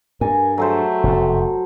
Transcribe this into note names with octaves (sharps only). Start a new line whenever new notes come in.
G2 A#4 G#5
F#3 A3 A4 C5
F1 F#2 B2